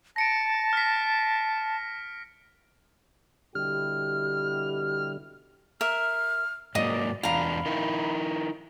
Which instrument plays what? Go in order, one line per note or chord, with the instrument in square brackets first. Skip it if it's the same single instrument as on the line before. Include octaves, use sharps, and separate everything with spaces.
[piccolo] A5 [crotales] A#6 C#7 D7
[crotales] F6 A#6 B6
[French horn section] B2 E4 G4 [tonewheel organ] D3 G3 [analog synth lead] F6
[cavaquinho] A#4 E5 [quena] F6
[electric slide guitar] G#2 F#3 A#3 [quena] D5 [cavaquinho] D#5 D#6
[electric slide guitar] E2 D4 F4 [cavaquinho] F5 A#5 [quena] B5
[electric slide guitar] D#4 E4 A#4